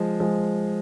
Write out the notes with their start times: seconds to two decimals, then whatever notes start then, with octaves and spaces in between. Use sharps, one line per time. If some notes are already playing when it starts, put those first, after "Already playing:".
Already playing: F3 G#3
0.20 F3 G#3